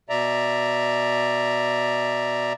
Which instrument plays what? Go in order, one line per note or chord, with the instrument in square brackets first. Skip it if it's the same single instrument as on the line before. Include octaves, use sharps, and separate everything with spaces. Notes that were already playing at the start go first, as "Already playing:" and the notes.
[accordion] B2 D5 E5 A#5